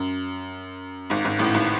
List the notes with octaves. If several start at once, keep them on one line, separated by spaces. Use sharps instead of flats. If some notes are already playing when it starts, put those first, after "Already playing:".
Already playing: F#2
G#1 G#2
G#1 G#2
A1 A2
G#1 G#2